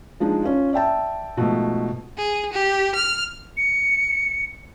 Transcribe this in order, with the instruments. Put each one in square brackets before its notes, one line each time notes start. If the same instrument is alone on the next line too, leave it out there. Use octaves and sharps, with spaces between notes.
[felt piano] F3 G#3 D4 D#4
C#4 F4
D5 E5 G5 A5
G#2 B2 F3 A3
[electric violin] G#4
G4
F6
[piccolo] C#7